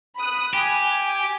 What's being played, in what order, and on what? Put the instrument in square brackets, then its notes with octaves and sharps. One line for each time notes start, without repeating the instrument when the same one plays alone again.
[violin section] B5 D#6 F#6
[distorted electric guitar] G4 [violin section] G#5